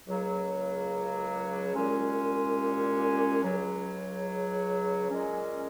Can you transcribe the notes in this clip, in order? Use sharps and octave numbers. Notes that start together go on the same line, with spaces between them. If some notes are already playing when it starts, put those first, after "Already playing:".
C#2 C#3 F#3 A#3
C2 A#2 G#3 C#4
C#2 C#3 F#3
A#2 G#3 C#4